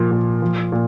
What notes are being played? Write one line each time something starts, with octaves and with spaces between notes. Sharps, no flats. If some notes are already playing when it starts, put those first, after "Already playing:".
Already playing: A#2 F3
A#2
F3
A#2